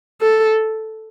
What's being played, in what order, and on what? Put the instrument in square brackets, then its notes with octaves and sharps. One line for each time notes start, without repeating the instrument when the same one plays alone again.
[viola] A4